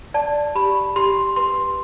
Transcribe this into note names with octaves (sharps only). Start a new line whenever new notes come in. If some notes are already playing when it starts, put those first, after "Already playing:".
D5 A5
G4 B5
G4 C6
B4 C6